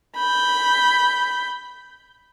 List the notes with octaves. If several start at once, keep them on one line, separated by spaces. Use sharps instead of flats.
B5 G6